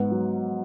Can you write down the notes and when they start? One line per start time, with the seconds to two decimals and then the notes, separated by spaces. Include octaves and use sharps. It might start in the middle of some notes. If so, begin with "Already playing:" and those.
Already playing: G#2 B3 F#5
0.11 F#3